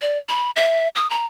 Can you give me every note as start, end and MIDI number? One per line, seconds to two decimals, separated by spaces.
0.01 0.18 74
0.29 0.50 83
0.56 0.88 76
0.95 1.09 87
1.10 1.26 82